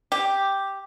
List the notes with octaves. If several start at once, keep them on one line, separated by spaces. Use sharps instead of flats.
G4